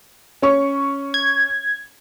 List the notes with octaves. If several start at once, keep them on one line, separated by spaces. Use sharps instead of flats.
C#4 C#5 C#6
G#6